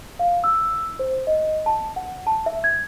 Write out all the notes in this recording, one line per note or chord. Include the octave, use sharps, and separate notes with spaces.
F5
E6
C5
D#5
A5
F#5
A5
E5
G#6